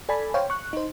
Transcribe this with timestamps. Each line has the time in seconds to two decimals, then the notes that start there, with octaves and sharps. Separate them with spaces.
0.09 A4 D5 G#5 A5 B5
0.34 C5 C#5 F5 G5
0.50 C#6 F#6
0.73 D#4 C5